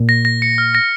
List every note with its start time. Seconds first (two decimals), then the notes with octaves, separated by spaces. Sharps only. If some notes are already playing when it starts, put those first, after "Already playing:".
Already playing: A#2
0.09 A#6
0.25 A#6
0.42 C#7
0.58 F6
0.75 A#6